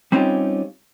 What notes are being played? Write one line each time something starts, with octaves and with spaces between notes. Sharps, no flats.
G3 C4 C#4 D#4 F4 G4